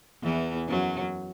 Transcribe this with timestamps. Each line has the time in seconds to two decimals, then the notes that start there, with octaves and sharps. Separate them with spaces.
0.23 E2 E3
0.68 F#2 F#3